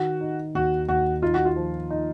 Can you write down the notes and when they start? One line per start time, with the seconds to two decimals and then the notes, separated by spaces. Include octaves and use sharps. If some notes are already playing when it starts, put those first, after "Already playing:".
Already playing: D#3 F#4
0.21 D#4
0.55 D#2 F#4
0.88 D#2 F#4
1.22 D#4 F4
1.34 F#4
1.45 F4
1.56 F3
1.90 D#4